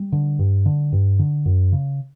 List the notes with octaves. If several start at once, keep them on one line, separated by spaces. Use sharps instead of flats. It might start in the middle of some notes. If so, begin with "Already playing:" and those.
Already playing: G3
D3
G2
D3
G2
D3
F#2
C#3